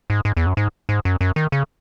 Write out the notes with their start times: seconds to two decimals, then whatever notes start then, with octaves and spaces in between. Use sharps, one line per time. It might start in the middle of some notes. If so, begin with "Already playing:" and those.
0.10 G#2
0.25 G#2
0.37 E2
0.46 F#2
0.57 G#2
0.89 G#2
1.05 F#2
1.21 F#2
1.36 D#3
1.52 C#3